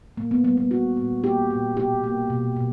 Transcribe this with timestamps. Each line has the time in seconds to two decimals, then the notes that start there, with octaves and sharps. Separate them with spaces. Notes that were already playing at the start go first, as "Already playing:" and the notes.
0.17 A#2 A#3
0.31 B3
0.44 G3 B3
0.57 B3
0.71 G3 F#4
0.97 A#2
1.24 A#3 G4
1.50 A#2
1.77 B2 G4
2.04 A#3
2.30 B2
2.56 B2